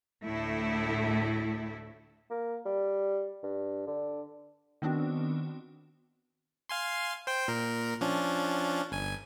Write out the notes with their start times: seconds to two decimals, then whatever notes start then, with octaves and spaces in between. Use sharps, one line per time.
0.23 D2 A2 A3 E4
2.30 A#3
2.66 G3
3.44 G2
3.87 D3
4.82 D#3 B3 C4 D4 F#4
6.69 F5 G#5 C6
7.27 C5 G5
7.48 A#2 A#4
8.01 F3 C#4 D4
8.92 G1 G#5